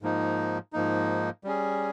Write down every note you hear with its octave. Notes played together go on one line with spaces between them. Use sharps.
G#2 F3 A#3 D#4
G#2 F3 A#3 D#4
G3 C#4 G#4